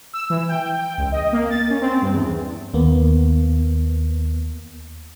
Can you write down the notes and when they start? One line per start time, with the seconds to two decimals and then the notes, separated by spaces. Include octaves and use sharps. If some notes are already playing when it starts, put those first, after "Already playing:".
0.13 E6
0.30 E3
0.49 G5
0.79 G5
0.98 C#2
1.12 D#5
1.33 A#3
1.50 A6
1.70 C#4
1.81 C4
2.02 G2
2.13 E2
2.74 D#2 A#3 B3